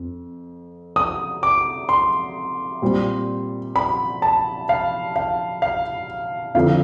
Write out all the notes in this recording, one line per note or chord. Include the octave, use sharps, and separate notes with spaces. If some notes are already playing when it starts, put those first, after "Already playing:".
Already playing: F2
D#6
D6
C6
A#2 G3 C4
B5
A5
F5
F5
F5
F2 D3 F3 F5